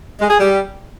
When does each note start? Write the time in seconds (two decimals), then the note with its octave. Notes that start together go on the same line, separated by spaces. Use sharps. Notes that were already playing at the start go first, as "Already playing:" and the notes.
0.21 G#3
0.30 G#4
0.40 G3